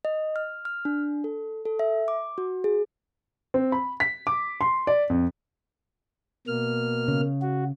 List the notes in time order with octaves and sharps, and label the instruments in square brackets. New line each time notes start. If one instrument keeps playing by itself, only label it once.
[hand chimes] D#5
F6
F6
D4
A4
A4
E5
D6
F#4
G#4
[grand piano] C4
B5
B6
D6
C6
D5
F2
[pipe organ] B2 A#3 F6
[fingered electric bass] C#3
[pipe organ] F#4